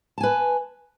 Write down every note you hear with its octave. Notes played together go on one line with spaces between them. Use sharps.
B4 G#5 A5